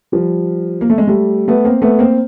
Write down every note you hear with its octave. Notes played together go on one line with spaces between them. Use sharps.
F3 G3
A#3
A3
G#3
G3 A3
A3 B3
A#3 C4
A3 B3
A#3 C4